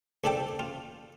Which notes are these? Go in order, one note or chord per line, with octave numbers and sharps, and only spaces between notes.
C2 C#3 D4 A4 G5 D6
F4